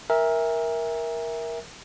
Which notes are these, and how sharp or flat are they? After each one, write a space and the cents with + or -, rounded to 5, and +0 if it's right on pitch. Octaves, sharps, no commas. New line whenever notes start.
A#4 +10 E5 -10 G#5 -40